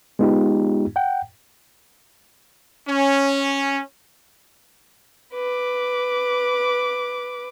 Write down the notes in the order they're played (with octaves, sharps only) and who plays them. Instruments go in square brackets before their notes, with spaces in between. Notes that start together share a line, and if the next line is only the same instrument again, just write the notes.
[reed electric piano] G#3 B3 D#4 F4 G4
F#5 G5
[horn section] C#4
[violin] B4 D6